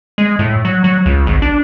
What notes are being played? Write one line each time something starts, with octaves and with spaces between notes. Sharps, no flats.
G#3
A2
F#3
F#3
C#2
G#1
D4